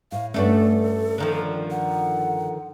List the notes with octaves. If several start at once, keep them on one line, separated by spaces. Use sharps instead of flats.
A2 F5
G2 A3 C#4 D4 F#4 A4
D3 D#3 F3
F#5